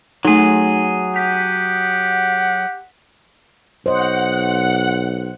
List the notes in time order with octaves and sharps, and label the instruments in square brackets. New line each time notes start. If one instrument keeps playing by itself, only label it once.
[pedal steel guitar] F#3 G#4 [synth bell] A3 D#4
[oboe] G4 [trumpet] F#5 [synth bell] B6
[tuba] B1 [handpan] C5 C#5 D#5 [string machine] F#5